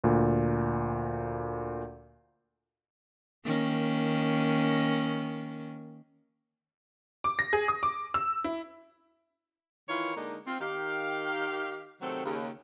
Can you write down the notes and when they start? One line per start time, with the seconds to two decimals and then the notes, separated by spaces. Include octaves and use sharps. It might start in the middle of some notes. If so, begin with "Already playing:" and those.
0.04 D2 A#2
3.44 D#3 A#3 C#4
7.24 D6
7.39 A#6
7.53 G#4
7.68 D#6
7.83 D6
8.14 E6
8.44 E4
9.89 D#3 E3 E4 F4 A#4 C#5
10.16 D3 G#3 A#3 D4 D#4
10.46 C4 F4
10.61 D#3 G4 F5
12.01 C3 D#3 F#3 A3 C4 A4
12.25 D#2 C#3